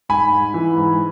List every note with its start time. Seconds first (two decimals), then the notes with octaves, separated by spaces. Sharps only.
0.09 G#2 G#5 B5
0.32 G#2
0.54 E3
0.76 G#2